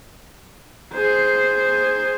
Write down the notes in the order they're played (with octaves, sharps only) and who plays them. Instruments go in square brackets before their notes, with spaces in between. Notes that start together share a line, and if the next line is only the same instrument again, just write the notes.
[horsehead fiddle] G#4 C5